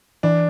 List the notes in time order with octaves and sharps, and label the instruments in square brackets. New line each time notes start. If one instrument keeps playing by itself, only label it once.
[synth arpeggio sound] E3 [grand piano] D4